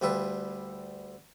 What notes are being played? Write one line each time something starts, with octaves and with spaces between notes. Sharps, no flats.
D2 G3 F4 A4 B4